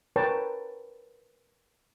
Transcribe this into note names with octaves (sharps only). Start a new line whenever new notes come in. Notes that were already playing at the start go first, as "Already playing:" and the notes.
A#4 B4 C#5 G5 A5